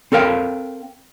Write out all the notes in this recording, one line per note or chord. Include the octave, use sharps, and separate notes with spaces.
C4 A4 A#4 F5 G5